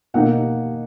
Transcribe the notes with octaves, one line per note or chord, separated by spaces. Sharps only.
B2 A#3 D#4 F#5